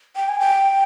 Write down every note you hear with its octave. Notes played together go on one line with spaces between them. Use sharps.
G5
G#5
G5